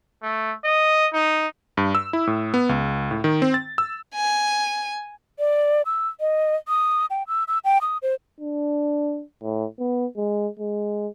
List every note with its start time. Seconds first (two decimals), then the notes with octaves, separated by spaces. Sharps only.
0.22 A3
0.64 D#5
1.13 D#4
1.77 G2
1.95 E6
2.13 E4
2.27 A2
2.54 B3
2.69 C#2
3.11 A2
3.24 D#3
3.42 C4
3.54 A6
3.78 E6
4.15 G#5
5.39 D5
5.86 E6
6.20 D#5
6.68 D#6
7.10 G5
7.28 E6
7.48 E6
7.65 G5
7.82 D#6
8.02 C5
8.40 D4
9.43 A2
9.79 B3
10.17 G#3
10.59 G#3